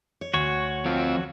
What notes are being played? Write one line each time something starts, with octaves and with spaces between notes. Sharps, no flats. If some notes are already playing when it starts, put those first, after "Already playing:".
C#5
D2 F#4 C#5
F2 C4 F4